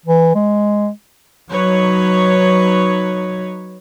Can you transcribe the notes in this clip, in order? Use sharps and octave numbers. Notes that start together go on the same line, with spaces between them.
E3
G#3
F#3 D#4 B4 C#5